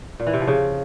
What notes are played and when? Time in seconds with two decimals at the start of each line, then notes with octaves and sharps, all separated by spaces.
0.20 A#2
0.27 E3
0.33 C3
0.40 F3
0.47 C#3